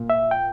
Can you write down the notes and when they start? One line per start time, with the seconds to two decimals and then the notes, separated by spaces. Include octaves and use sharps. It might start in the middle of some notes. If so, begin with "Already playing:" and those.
Already playing: A#2 A#3
0.10 E5
0.31 G5